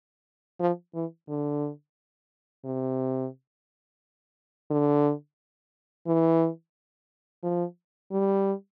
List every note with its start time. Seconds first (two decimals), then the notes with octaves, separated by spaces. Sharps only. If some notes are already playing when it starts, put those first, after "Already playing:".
0.60 F3
0.94 E3
1.28 D3
2.65 C3
4.70 D3
6.07 E3
7.43 F3
8.11 G3